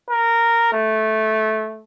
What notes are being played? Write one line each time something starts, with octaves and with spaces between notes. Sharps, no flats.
A#4
A3